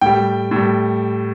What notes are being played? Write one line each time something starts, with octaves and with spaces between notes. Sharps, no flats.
A2 G3 G5
A2 G3